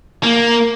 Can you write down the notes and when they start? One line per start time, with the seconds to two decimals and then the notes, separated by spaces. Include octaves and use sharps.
0.23 A#3